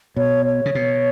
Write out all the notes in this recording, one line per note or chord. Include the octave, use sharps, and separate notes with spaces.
B2 C#5
C#5
C#3
B2